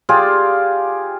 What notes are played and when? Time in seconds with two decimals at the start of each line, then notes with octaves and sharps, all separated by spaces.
0.09 F4 G4 G#4 D5